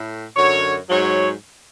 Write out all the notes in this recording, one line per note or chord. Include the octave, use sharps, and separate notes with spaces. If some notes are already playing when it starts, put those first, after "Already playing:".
Already playing: A2
F#2 D3 F#3 C#5
G#2 F#3 C#5